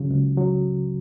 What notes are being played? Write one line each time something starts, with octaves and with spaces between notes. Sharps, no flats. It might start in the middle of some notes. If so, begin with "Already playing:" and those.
Already playing: C#2 C#3 F#3
C#2
F#3